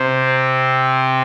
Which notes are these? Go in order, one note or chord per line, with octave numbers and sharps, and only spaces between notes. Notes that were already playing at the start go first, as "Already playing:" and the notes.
Already playing: C3 C4